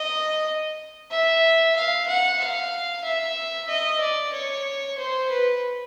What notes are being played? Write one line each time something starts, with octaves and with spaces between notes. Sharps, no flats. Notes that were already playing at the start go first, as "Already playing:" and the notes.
Already playing: D#5
E5
F5
F#5
F5
E5
D#5
D5
C#5
C5
B4